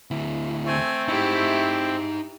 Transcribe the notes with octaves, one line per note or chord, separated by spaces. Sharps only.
D2 E4
A3 C4 G#5
D#4 E4 G4 C5